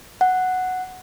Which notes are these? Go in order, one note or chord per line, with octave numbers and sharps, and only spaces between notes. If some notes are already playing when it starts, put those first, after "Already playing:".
F#5